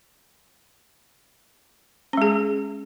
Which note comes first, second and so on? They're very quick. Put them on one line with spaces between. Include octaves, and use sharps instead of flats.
C#4 G#3 G#4